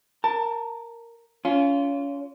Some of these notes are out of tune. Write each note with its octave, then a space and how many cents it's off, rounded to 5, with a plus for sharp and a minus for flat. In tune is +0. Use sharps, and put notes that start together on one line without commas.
A#4 +0 A5 +20
C#4 +25 F4 -15